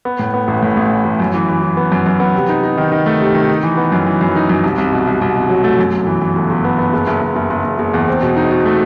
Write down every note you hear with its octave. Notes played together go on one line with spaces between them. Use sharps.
B3
A2
B3
A1
A2
A1
E3
A1
F#2
E3
E3
E3
B3
F#2
F#2
B3
C3
D#4
D#4
D#3
D#3
A3
C3
D#3
D#4
E3
B3
F#2
E3
F#2
D#4
F#2
C2
C2
B2
C2
C2
B2
F#3
A3
F#2
G1
E3
E3
G1
G1
B3
B3
F#1
F#1
F#1
F#1
F#1
F#1
F#1
E2
C4
B2
D#4
B2
A3